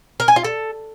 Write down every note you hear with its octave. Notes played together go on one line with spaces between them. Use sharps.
A#4
G#5
F4
A4